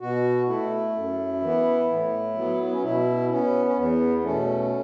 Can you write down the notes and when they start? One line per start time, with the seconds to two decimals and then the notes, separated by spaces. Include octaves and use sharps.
0.01 B2 F#4
0.47 A3 E4
0.95 F#2
1.41 E3 B3
1.89 A2
2.35 F#3 B3
2.62 B3
2.73 C#4
2.82 B2 E4
3.30 B3 C#4
3.66 C#4
3.77 E2 B3
4.18 B3
4.23 B2 A3 C#4